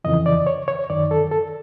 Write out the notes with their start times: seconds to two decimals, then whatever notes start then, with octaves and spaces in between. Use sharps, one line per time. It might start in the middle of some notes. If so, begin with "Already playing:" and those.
0.04 F2 C#3 E3 D#5
0.26 D5
0.47 C#5
0.68 C#5
0.90 F#2 D#3 D5
1.11 A4
1.31 A4